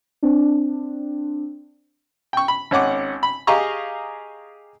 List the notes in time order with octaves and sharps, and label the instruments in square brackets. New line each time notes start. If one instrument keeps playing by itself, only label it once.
[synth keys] C4 D4
[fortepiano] G5 C#6
B5
G#1 C#4 F#5 D6
B5
G4 G#4 D#5 F5 A#5 C#6